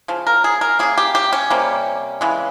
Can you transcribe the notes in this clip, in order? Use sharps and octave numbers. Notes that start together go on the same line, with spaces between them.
C#3 F3
A#4
G#4
A#4
C#3 G3 A#3 G#4
G4
G4
C#4
C3 G3 A#3
C#3 E3 G#3